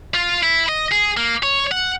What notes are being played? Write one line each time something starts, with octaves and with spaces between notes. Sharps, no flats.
F4
E4
D#5
G#4
A#3
C#5
F#5